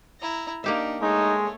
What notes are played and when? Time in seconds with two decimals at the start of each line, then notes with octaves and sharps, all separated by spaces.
0.20 E4 A#5
0.64 A#3 D4 D#4 G4 E5
1.02 G#3 A3 D#4 C#5